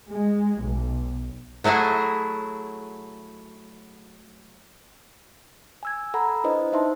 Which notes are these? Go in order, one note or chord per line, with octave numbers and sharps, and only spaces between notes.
G#3
B1
F#3 A3 E4 F#4 G#4
G#5 E6 G#6
A4 F#5 A#5 B5
D4 E4 B4 C5 D#5
D#4 C5 E5 A5 C6